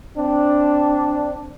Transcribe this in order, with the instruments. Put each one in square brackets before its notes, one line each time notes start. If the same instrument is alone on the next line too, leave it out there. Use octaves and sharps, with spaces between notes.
[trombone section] C4 D4